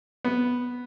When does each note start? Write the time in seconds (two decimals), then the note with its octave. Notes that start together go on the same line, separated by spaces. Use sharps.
0.25 B3